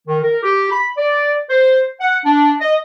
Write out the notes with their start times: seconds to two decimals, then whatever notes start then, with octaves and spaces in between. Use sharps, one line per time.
0.08 D#3
0.23 A#4
0.43 G4
0.71 B5
0.97 D5
1.50 C5
2.00 F#5
2.25 D4
2.60 D#5